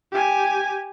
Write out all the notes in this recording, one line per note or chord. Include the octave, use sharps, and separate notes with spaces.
G4 G#5